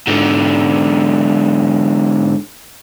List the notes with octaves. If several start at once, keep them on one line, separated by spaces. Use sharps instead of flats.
G#2 D3